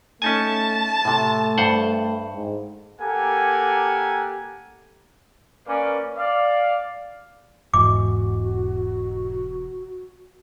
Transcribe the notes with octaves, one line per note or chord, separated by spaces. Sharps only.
A3 C#4 D#4 G#5 A5
A2 C3 A3
G2 C5 F#5
G#2
A#3 G4 A4 A#4 F#5 G#5
A#3 C#4 B4 D5
D5 F5
E1 E2 G#2 E3 F#4 D6